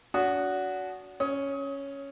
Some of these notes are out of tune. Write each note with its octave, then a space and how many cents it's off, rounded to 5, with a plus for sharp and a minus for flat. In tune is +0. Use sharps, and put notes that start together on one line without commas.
D4 -40 F#4 +0 D#6 -10
C#4 +0 D#6 +30